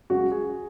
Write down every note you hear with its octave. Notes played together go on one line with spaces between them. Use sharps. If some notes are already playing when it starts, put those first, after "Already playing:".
F#2 C#3 G#3 F#4
G#4